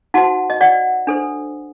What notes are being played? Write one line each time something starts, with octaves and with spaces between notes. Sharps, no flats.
D#4 F#4 C5 F#5 A5
D#5
D5 F#5
D4 A4 C5